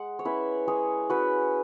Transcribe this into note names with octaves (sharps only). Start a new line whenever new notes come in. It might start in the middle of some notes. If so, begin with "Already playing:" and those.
Already playing: G#3 F#5
C#5
C#4 E4 B4 E5
G#3 G#4 C#5
C#4 E4 F#4 B4